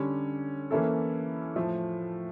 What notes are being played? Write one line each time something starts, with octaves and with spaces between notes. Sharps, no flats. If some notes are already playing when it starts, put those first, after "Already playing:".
Already playing: D3 G3 C#4
E3 A#3 C#4 E4 A4
A2 F3 A3